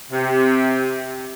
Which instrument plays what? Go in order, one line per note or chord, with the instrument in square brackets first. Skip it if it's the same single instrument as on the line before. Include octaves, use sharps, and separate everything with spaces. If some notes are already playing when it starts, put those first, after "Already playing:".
[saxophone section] C3